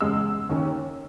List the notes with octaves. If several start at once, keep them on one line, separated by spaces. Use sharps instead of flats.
E2 C#3 G#3 E6
D#2 D#3 A#3 C#4